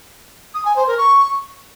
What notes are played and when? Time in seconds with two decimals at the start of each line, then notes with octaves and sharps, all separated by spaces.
0.54 D#6
0.65 G#5
0.76 C5
0.87 A#4
0.98 C#6